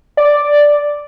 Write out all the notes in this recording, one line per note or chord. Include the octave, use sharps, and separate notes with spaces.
D5